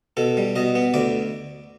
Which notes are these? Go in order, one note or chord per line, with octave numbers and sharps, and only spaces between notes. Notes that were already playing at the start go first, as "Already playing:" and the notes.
B2 A4
G3
B2 D#5
B3
D2 D5